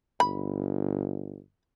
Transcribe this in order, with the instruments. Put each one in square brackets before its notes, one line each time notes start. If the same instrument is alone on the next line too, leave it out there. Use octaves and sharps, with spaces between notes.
[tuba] G1 [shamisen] B5